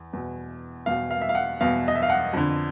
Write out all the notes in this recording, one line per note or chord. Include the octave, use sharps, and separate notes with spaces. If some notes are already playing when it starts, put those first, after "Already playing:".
Already playing: E2
E2 B2
E2 B2 F5
F5
E5
F5
F#5
E2 B2 F5
D#5
E5
F5
F#5
F2 D3